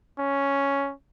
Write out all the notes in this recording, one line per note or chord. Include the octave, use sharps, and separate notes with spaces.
C#4